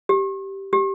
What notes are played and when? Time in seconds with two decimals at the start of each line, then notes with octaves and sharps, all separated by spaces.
0.09 G4
0.73 G4